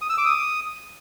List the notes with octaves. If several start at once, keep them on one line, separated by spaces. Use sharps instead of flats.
D#6
E6
D6
D#6